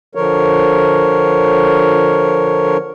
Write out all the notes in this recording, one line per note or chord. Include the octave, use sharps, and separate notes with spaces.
D3 F3 A#4 C#5